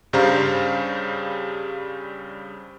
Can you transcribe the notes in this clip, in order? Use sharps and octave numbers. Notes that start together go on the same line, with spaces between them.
G2 C#3 G3 C5 F5 A#5